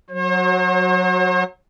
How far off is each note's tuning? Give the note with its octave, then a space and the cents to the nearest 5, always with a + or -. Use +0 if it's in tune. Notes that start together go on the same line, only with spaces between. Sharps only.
F#3 -15 C5 +45